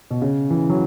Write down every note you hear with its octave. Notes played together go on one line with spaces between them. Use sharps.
B2
C#3
E3
F#3